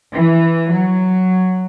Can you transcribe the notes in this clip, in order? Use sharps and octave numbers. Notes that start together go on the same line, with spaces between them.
E3
F#3